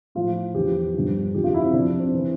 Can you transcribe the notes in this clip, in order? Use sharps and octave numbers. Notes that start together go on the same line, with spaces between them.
A2 F3 F4
E2 D3 F3 G4
G2 D3 F3
F2 D3 F3 G4
F4
E4
C4
F2 C3 F3 D4
C4
E3